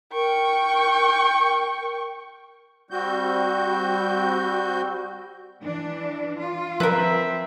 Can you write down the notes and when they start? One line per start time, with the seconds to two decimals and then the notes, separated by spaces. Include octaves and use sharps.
0.13 A#4 G5 C#6
2.91 G3 C4 F#4 G6
5.63 E3 D4
6.39 F4
6.80 F3 C4 A#4 B4 E5